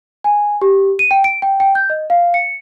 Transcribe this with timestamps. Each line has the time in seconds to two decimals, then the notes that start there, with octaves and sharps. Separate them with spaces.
0.24 G#5
0.62 G4
0.99 D#7
1.11 G5
1.24 D7
1.42 G5
1.60 G5
1.75 G6
1.90 D#5
2.10 F5
2.34 C#7